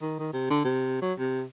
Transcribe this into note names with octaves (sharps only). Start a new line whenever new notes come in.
D#3
D#3
C3
D3
C3
F#3
C3